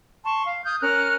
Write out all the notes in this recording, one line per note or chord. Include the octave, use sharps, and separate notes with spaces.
A5 C6 C#6
F5
D#6 F6 G6 G#6
C#4 A#4 F6 F#6